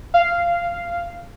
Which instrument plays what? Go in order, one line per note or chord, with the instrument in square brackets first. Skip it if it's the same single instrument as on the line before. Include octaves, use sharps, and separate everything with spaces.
[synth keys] F5